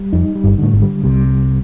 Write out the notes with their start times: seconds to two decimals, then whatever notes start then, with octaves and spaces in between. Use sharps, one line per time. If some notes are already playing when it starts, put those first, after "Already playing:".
Already playing: G3
0.13 F2 D#4
0.36 G3
0.44 G1 G2
0.58 A2 D3
0.73 G#1 G#2
0.82 G3
1.04 C2 C3 G3
1.27 G3